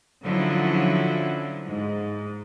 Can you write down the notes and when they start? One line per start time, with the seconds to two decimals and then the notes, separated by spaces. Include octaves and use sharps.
0.25 D3 F3 F#3 C#4 E4
1.67 G#2